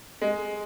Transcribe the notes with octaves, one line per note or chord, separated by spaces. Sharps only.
G#3